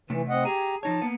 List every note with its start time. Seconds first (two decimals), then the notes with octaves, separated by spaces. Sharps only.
0.10 C3 E3 A3
0.29 C4 D#5 F#5
0.45 G4 G#4 A#5
0.83 F3 D#4 C#5 A5
1.02 A#3 B3